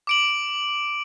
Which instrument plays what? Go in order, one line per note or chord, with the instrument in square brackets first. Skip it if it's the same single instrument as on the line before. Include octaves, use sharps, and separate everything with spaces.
[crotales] D6 D7 F#7